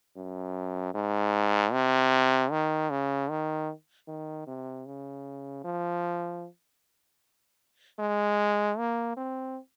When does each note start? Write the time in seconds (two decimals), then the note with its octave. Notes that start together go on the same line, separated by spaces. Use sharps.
0.16 F#2
0.94 G#2
1.73 C3
2.51 D#3
2.90 C#3
3.30 D#3
4.08 D#3
4.47 C3
4.86 C#3
5.64 F3
8.00 G#3
8.78 A#3
9.17 C4